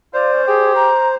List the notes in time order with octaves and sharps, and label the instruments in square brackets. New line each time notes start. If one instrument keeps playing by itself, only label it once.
[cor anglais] F4 [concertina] C5 [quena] D5
[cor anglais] C#4
[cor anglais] G4 [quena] G#4
[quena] A#5